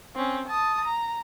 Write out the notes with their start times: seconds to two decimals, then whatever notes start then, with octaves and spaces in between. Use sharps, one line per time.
0.16 C4 C#4
0.48 A5 D#6
0.85 A#5